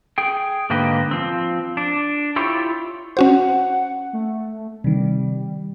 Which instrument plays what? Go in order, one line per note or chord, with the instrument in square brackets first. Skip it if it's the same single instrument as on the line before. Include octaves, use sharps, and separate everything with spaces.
[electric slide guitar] G#4 G5
G#2 D3 A#3 G4 B4 D#5
F3 C4
D4
E4 F4 G4 C#5
[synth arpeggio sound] C#4 F#4 C5 [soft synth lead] F#5
[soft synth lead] A3
[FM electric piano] C3 D#3 [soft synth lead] G3